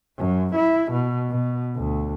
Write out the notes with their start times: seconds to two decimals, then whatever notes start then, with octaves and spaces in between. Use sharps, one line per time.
0.18 F#2
0.56 E4
0.92 B2
1.30 B2
1.76 D2